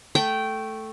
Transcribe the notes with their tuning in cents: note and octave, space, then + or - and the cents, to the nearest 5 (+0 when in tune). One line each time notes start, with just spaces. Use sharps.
A3 +0 G5 -15